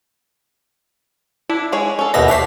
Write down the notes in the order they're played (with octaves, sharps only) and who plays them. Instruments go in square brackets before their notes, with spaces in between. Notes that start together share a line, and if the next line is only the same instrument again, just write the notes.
[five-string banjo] D4 [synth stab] E4
[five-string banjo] G#3 G#4 C#5
C#4 A4
[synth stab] D#2 B2 A#6 [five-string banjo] F3 B3 E5
[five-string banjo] G4 A4 C#5 [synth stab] B6 C7